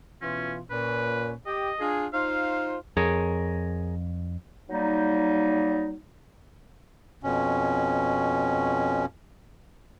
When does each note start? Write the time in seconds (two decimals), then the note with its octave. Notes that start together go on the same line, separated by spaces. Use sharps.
0.22 B2 E3 C#4 F4
0.71 A#2 C#4 B4
1.46 G4 D#5
1.79 D4 F4 G#4
2.13 D#4 F4 C5 F5
2.97 F2 G#4 A#4 C#5
4.70 F#3 G3 A#3 D#4
7.23 F2 B2 C#4